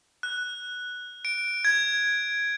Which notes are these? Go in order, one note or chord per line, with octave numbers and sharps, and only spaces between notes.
F#6
D7
G#6